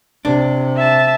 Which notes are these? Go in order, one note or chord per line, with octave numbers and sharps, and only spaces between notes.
C3 D4
E5 A5